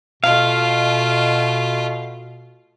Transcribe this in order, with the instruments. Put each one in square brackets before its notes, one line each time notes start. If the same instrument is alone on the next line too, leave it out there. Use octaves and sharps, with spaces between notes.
[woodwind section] B2 [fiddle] A3 F4 [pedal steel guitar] F5